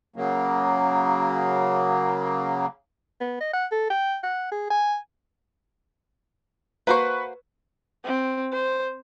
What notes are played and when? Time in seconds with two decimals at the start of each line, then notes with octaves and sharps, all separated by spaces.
0.16 C#3 F#3 A#3
3.21 B3
3.41 D#5
3.54 F#5
3.72 A4
3.90 G5
4.23 F#5
4.52 G#4
4.70 G#5
6.87 A#3 F#4 B4 C5 C#6
8.05 C4
8.53 C5